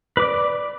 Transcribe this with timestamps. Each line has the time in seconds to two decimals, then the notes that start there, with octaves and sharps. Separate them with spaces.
0.17 B4
0.20 D6
0.22 D5